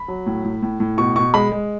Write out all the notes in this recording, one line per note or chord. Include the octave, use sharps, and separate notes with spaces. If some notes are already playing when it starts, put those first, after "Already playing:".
Already playing: B5
F#3
A2
A2
A2
A2
B2 C#6
B2 C#6
G#3 B5
G#3